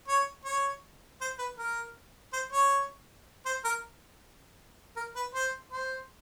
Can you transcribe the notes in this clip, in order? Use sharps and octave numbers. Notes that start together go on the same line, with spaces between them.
C#5
C#5
C5
B4
A#4
C5
C#5
C5
A#4
A#4
B4
C5
C5